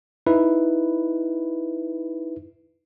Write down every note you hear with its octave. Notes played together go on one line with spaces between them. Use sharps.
D#4 E4 B4